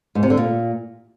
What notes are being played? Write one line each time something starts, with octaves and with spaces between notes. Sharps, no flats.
G#2
C3
D3
A#2